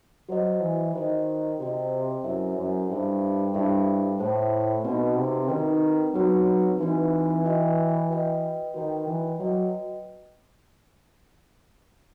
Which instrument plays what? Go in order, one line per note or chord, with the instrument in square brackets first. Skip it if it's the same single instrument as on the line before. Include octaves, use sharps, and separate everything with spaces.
[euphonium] F#3 [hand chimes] F#4 C5 D#5
[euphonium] E3
[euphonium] D#3 [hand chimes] F#4 C5 D#5
[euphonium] C3 [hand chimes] F#4 C5 D#5
[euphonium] F#2 [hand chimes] E4 A4 C5 E5
[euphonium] F#2
[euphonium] G2 [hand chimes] E4 A4 C5 E5
[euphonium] G2 [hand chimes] E4 A4 C5 E5
[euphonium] A2 [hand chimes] E4 A4 C5 E5
[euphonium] B2 [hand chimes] C4 D#4 F#4 B4
[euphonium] C3
[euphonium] D#3 [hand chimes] C4 D#4 F#4 B4
[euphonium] F#3 [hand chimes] C4 D#4 F#4 B4
[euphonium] E3 [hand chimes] C4 D#4 F#4 B4
[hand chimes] F#4 B4 D#5 G5
F#4 B4 D#5 G5
[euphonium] D#3 [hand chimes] F#4 B4 D#5 G5
[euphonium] E3
[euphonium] F#3 [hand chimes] F#4 B4 D#5 G5